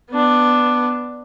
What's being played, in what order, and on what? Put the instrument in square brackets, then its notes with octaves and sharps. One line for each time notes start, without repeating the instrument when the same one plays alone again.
[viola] B3 D4